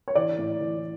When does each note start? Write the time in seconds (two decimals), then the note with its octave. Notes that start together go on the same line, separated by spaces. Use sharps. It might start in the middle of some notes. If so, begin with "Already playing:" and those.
0.08 C#5
0.15 E3 D5
0.38 A2
0.61 E3